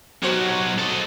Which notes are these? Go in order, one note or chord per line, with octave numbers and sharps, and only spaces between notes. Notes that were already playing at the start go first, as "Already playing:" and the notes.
B1 F#3 F#4 G4 C5
A4 D#5